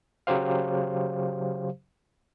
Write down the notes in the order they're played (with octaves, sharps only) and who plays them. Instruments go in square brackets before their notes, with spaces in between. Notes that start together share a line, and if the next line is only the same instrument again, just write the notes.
[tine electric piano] C#3 F#3 G4 C5 F5